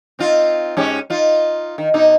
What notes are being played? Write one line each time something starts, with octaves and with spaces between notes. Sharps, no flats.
C4 D#4 F4
G#2 C#4 G4
D#4 F4
D#3
B2 D#4